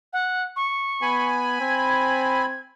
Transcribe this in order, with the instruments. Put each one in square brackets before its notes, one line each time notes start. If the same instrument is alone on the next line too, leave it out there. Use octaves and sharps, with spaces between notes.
[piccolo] F#5
C#6
[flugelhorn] B3 [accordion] G#5 B5
[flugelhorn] C4 [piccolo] G#6